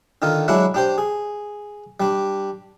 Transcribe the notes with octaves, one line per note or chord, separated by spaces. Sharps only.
D3 D#3 D#4 F4
F#3 G#3 D4 E4 F#4 F#5
D4 G4 C5
G#4
G3 D4